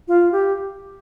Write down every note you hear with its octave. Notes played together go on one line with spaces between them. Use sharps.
F4
G4